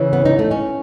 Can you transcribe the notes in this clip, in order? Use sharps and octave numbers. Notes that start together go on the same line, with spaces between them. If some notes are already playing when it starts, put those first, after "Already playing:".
Already playing: C#3 E3
B3
D#4
A3
C#4